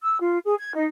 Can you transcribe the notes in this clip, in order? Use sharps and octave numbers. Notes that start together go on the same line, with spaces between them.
E6
F4
G#4
G#6
D#4